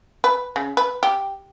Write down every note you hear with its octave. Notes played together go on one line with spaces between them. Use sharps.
B4
C#3
B4
G4